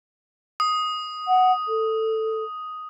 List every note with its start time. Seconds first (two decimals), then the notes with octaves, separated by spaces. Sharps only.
0.60 D#6
1.28 F#5
1.68 A4